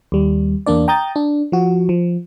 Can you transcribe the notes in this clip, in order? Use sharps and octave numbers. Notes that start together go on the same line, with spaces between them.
D#2 G3
E2 A#3 D4 D5
G5 A#5 D#6 G6 A6
D4
F3 F#4
F3